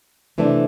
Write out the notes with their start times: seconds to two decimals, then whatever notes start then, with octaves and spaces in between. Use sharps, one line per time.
0.38 C3 E3 A3 D4